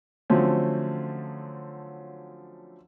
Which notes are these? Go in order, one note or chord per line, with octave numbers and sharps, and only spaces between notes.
D3 F3 F#3 A3 C4 C#4